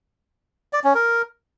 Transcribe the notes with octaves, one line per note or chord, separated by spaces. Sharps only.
D5
C#4
A#4